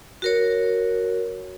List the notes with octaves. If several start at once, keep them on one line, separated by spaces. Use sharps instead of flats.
F#4 A#4 C#5